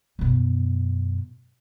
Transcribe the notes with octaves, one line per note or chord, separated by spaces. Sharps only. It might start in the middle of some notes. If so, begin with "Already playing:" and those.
F#2 B2